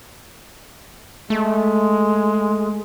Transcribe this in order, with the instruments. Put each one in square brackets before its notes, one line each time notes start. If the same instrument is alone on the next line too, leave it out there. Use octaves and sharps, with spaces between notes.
[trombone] G#3 [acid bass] A3